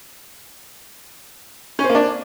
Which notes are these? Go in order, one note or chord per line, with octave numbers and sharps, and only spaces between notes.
C#4
C4
A#3
D4